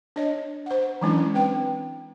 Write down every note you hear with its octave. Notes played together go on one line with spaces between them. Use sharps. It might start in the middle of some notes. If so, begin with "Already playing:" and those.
D4 C#5 D#5
C5 F#5
E3 F#3 G#3 C#4 D4 E4
C4 B4 G5